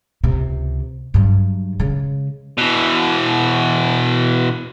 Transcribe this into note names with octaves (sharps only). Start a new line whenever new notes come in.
C#2 C3
G2 F#3
C#3 G#3
B2 E3